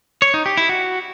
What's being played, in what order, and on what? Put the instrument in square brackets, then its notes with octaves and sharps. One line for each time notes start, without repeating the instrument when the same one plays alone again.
[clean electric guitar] C#5
D#4
G4
E4
F#4